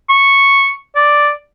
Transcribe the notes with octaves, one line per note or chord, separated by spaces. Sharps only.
C#6
D5